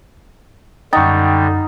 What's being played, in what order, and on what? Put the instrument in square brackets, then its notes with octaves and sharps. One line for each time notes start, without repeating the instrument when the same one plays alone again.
[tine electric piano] F#2 F#5 A6 [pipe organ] D3 G3 [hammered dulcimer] D#4 [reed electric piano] G5 C#6